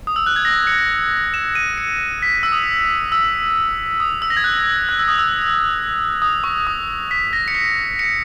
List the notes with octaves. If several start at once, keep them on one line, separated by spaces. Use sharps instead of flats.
D#6
E6
F#6
G#6
A#6
C#7
E7
D#7
C#7
B6
E6
D#6
E6
D#6
E6
A#6
G#6
F#6
F#6
E6
D#6
E6
D#6
C#6
D#6
B6
A#6
C#7
B6
C#7